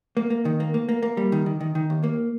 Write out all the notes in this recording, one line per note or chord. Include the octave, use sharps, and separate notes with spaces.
A#3
A#3
D#3
A#3
A#3
A#3
A#3
G3
D#3
D#3
D#3
D#3
D#2
A#3